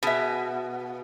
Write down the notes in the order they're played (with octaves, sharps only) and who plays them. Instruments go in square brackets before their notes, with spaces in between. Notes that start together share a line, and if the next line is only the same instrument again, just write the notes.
[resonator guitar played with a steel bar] B2 [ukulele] G#4 E5